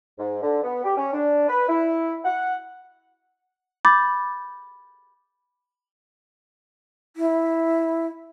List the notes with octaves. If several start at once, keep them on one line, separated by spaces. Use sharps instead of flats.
G#2
D3
B3
G4
C#4
D4
B4
E4
F#5
B5 D6 G6 A6
E4